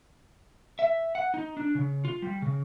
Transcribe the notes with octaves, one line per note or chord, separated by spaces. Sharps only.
E5
F#5
D#4
D4
C#3
F4
G3
C#3